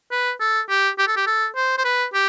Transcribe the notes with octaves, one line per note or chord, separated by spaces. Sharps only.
B4
A4
G4
G4
A4
G4
A4
C5
C5
B4
G4